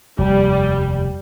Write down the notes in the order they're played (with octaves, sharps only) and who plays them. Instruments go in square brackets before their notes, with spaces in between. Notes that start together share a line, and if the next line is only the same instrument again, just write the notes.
[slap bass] F1 D#2 [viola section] G3